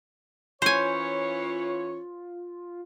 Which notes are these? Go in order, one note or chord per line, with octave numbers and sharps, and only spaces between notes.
E3 C#4 F4 C5 C#5 G#5